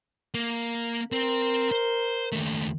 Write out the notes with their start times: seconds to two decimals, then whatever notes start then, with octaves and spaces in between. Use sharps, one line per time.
0.34 A#3
1.12 C4 A#4
1.71 C5
2.32 D#2 A3